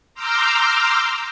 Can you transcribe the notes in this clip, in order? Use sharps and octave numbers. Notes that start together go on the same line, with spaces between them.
A#5 C6 D6 E6 F6 G6